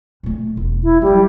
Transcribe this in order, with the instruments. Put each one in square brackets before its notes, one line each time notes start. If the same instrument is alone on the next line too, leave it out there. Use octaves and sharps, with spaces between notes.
[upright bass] A#2 A3
E1
[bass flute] E4
[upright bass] D#3 F#3 [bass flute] G3